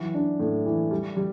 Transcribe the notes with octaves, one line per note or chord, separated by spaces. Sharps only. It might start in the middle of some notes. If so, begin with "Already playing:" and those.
Already playing: E3 F#3
D4
A2
E3
G3
G3